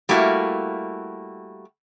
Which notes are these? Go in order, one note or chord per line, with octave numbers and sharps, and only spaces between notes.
G3 A3 A#3 E4 F#4